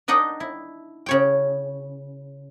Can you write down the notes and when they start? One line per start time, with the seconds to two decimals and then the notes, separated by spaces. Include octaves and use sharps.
0.08 D4 D#4 D#5 F#5 G5
0.40 E4
1.06 C#3 C#5 G5